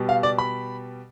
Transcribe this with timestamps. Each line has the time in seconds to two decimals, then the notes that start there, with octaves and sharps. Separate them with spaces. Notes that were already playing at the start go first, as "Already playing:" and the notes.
Already playing: B2 G3
0.09 F5
0.23 D5
0.38 B5